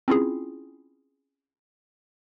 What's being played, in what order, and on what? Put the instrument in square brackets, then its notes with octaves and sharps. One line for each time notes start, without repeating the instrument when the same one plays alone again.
[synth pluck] C4 C#4 E4 F4 G#4